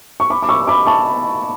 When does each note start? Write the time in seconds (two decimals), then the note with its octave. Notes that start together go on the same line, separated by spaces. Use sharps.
0.20 C#6
0.30 B5 D6
0.43 D6
0.49 C#6 E6
0.67 B5 D6
0.86 A5 C#6